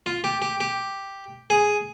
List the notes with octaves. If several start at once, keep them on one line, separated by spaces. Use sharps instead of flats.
F4
G4
G4
G4
G#4